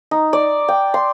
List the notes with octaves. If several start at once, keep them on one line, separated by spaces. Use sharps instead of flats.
D#4
D5
G5
C6